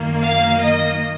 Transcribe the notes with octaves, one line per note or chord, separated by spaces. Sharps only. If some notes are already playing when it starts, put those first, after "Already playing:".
Already playing: F#2 D#3 A#3
F5
D#5